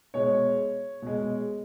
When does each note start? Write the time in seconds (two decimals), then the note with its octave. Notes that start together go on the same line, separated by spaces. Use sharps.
0.14 B2 G#3 C#5
1.02 B2 G#3